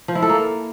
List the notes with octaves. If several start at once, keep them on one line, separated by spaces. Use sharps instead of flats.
F3
E4
A4
A#3